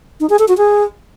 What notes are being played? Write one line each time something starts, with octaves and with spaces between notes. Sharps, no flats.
D#4
G#4
A4
F#4
G#4